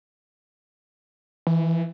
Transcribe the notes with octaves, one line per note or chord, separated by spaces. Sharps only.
E3